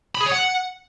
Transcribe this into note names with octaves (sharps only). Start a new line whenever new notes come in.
B5
G#4
C#5
F#5